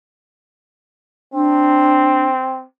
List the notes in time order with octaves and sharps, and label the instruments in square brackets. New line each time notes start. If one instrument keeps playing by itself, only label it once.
[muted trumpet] C4 [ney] D4